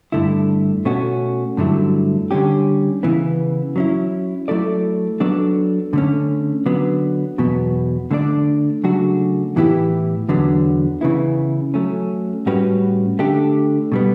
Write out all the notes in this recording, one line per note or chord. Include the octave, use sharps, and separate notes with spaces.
G2 D3 A3 E4
B2 A3 C#4 F#4
G2 D3 F#3 A3 E4
D3 G3 C#4 G4
C#3 E3 B3
F#3 C#4 E4
F#3 A3 E4 A4 D5
F#3 B3 D4 A4 D5
D3 A3 C#4
D3 F#3 B3
E2 B2 F#3 B3
D3 A3 D4 A4 D5
C#3 F#3 A3 D4 F#4
A2 E3 B3 E4 G4
E2 D3 F#3 B3
C#3 E3 B3 E4
F#3 A3 C#4
A2 G3 C#4 F#4 B4
D3 A3 D4 G4
B2 G3 B3